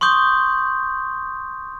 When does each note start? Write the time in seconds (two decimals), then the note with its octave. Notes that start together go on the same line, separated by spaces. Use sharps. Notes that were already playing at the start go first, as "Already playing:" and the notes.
0.01 C6 C#6 D#6 G6